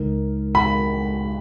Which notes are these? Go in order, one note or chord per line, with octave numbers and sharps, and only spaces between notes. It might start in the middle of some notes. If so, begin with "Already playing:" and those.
Already playing: C#2 C#3 G#3 D#4 A#4
B5